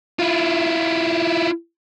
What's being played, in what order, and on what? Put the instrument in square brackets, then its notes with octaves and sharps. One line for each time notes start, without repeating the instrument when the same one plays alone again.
[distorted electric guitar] E4 F4